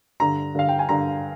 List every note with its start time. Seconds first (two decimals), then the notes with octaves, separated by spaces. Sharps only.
0.20 G2 D3 A#5
0.54 G2 D3 F5
0.69 G5
0.79 G#5
0.89 G2 D3 A#5